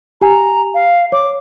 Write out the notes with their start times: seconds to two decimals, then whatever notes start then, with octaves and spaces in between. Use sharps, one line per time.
0.21 G4 G#5 A#5
0.74 F5
1.12 C#5 D6